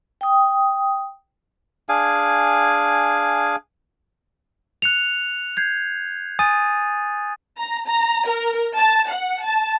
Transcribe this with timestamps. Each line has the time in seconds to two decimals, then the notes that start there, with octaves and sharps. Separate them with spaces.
0.21 G5 D#6
1.89 D4 G#4 F5 G#5
4.82 F#6 C#7 F7
5.57 G6 G#6 C7
6.39 G#5 D#6 A6 D#7
7.58 A#5
7.86 A#5
8.26 A#4
8.76 A5
9.09 F#5
9.42 A5